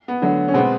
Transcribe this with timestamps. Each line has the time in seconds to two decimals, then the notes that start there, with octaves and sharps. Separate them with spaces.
0.08 B3
0.22 D3 F#3 A3
0.48 C#4
0.54 B2 G#3 B3 C4